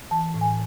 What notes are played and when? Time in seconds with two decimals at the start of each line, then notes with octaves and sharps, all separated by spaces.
0.11 E3 A5
0.34 A2
0.41 G#5